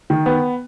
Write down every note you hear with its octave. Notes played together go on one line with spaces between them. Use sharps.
D#3
B3